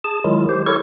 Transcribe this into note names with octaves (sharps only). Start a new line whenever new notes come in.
G#4 A5
D#3 F#3 G#3 E4 F4
G4 C5
E4 G4 A4 A#4 C#5 C#6